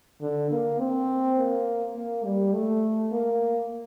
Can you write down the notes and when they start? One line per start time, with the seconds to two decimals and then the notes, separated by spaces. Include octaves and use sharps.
0.21 D3
0.51 A#3
0.80 C4
1.38 A#3
1.96 A#3
2.25 G3
2.54 A3
3.12 A#3